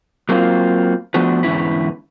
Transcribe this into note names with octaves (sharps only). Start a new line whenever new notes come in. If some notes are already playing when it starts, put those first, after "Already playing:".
F#3 A#3 C4 F4
F3 A3 B3 D4 F#4 B4
E2 G#2 D3 C#4 E4 B4